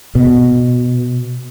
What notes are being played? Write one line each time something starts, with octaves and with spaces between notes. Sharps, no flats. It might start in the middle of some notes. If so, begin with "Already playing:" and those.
B2